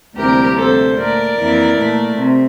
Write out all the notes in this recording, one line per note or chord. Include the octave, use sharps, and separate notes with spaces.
D2 C3 E3 G3 A#3 G4 A#4
D2 C3 F3 A4 C5
A#2 A3 A#4 D5
F2 E3 A#3
A#2 A3
C3